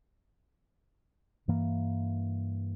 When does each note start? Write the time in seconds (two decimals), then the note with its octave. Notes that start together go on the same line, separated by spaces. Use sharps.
1.48 G2 E3 A#3